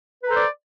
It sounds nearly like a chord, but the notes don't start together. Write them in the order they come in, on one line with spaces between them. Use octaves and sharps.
B4 A#5 A4 C5 D5